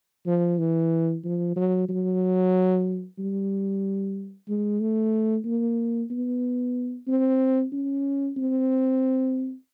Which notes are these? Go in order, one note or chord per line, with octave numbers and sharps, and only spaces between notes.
F3
E3
F3
F#3
F#3
G3
G#3
A3
A#3
B3
C4
C#4
C4